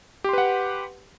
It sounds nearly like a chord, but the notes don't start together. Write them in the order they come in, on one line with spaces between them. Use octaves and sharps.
G4 C6 B4 F#5